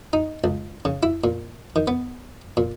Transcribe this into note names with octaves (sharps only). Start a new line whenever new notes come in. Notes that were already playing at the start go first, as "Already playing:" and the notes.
D#4
C#2
C#3
E4
A#2
D#3
B3
A#2